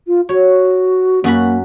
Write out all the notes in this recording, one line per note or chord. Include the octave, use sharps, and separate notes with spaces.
F4
F#4 C#5
F#2 A#3 F#4 B5